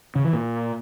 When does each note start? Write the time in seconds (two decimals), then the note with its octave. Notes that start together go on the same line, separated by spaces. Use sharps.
0.15 C#3
0.24 E3
0.33 A#2